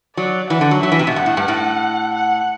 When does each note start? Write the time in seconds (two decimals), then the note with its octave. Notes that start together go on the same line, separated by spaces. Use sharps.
0.17 F#3 D5
0.50 E3 F#5
0.61 D3
0.71 F#3
0.82 F#3 E5
0.92 E3
0.99 C3
1.07 B2
1.16 G2 F#5
1.26 A2
1.37 G2
1.48 A2
2.15 F#5